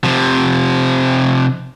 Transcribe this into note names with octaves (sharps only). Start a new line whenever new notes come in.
C3 F3